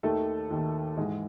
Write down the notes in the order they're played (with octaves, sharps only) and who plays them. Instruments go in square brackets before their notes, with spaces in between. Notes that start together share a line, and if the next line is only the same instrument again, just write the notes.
[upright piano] D#2 D#3 A3 A4
D#2 D#3
G#2 E3 G#3 G#4